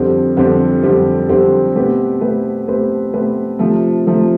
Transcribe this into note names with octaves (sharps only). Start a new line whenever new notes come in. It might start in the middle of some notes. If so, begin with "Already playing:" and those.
Already playing: F2 D3 G3 C4 G4
F2 D3 G3 C4 G4
F2 D3 G3 C4 G4
F2 D3 G3 C4 G4
B2 A3 C4 G4 B4
B2 A3 C4 G4 B4
B2 A3 C4 G4 B4
B2 A3 C4 G4 B4
C3 F3 A3
C3 F3 A3